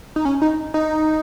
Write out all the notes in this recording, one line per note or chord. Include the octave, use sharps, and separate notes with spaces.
D#4
C#4
D#4
D#4